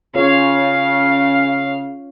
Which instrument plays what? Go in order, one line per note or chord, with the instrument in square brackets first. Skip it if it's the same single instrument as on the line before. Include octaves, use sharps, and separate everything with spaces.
[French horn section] C#3 [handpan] C#4 F4 C#5 [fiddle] F5